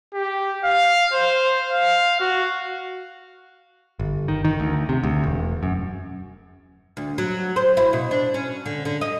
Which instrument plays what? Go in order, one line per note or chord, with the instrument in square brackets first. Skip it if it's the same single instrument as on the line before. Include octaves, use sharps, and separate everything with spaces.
[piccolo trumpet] G4
F5
C5
F5
F#4
[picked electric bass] G1
D#3
D#3
D2
C3
D2
E1
F#2
[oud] D2
F#3
C5
E4
B2
D4
C#4
D3
D3
D#5